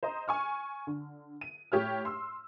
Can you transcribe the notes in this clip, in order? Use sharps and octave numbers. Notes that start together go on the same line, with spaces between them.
C5 D#5 A#5
G#5 C#6 F6
D3
D#7
A2 G4 C#5 F6
C6 E6